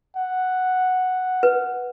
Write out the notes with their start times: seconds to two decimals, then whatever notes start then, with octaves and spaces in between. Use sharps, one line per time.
0.16 F#5
1.43 B4